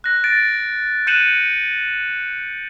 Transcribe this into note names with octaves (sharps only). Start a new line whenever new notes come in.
F#6 A#6
A6 D7
F#6 G6 C#7 D#7 E7 F#7